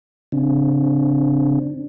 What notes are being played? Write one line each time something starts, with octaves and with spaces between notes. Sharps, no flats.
C#3 C4 D4